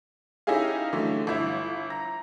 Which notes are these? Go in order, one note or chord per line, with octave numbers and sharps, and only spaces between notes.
C#4 D#4 E4 G4 G#4 F5
D3 E3 F#3 A3
G1 E4
A#5 A#6